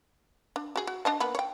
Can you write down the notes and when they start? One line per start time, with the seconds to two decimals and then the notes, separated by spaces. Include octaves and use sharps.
0.56 D4
0.76 F#4 G#4
0.87 F#4
1.05 D4 D#5 A5
1.20 A#3 B3 B4
1.35 C#5 G5